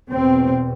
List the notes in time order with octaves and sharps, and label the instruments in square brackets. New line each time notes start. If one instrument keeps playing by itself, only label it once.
[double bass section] E2 B2 C4